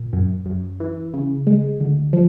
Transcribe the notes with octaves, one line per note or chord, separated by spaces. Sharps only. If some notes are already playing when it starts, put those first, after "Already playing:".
Already playing: A#2
F#2
F#2
E3
C#3
G#3
D2
F3